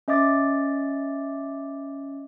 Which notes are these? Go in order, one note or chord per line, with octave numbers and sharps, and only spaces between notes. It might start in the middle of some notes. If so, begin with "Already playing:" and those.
C#4 D#5 E5 D6 A6